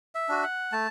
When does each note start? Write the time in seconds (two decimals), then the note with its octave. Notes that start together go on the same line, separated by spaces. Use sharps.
0.15 E5
0.29 D4 F#4
0.43 F#5
0.72 A3 A5